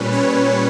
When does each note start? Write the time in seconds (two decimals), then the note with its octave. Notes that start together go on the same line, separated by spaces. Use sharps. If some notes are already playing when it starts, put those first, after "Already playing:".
Already playing: A#2 G3 C#4 B4
0.12 C#5